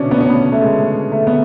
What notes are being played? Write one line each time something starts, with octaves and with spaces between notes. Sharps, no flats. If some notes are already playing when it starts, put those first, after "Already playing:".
Already playing: B2 C#4 D4
B3
C#4
B3
A3
G#3
A3
B3